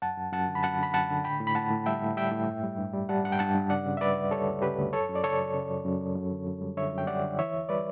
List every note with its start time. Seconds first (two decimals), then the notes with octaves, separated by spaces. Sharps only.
0.02 F#2 F#5 A5
0.18 F#2
0.32 F#2 F#5 A5
0.48 D3
0.55 B5
0.63 F#2 F#5 A5
0.78 D3 B5
0.94 F#2 F#5 A5
1.10 D3
1.24 A2 G5 B5
1.40 A2
1.47 B5
1.55 A2 F#5 A5
1.70 A2
1.86 G3 E5 G5
2.02 A2
2.17 G3 E5 G5
2.32 A2
2.47 G2
2.63 G3
2.78 G2
2.94 G3
3.09 G3 F#5 A5
3.24 G2 F#5
3.32 G5
3.39 G2 F#5 A5
3.55 G2
3.70 C#3 D5 F#5
3.86 C#3
3.97 E5
4.01 G3 B4 D5
4.17 D2
4.31 G3 A4 C#5
4.47 D2
4.62 C#3 G4 B4
4.78 D2
4.93 F#2 A4 C#5
5.09 F#2
5.15 D5
5.24 C#3 A4 C#5
5.39 F#2
5.54 C#3
5.70 F#2
5.84 F#2
6.01 F#3
6.15 F#2
6.31 D3
6.47 F#2
6.61 G3
6.77 D3 C#5 E5
6.93 F#2
6.98 G5
7.07 G3 D5 F#5
7.23 D3
7.39 E3 C#5 E5
7.54 D2
7.69 G3 B4 D5